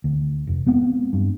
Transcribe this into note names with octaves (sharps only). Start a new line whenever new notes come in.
D2
F1
G#3 B3 C4
G2